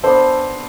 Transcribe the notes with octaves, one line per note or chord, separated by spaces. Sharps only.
B3 D4 A4 C5